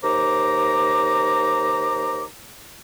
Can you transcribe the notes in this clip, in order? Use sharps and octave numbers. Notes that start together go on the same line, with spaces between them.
D#2 C5 A#5 D6